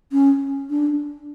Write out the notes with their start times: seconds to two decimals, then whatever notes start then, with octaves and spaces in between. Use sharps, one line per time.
0.12 C#4
0.70 D4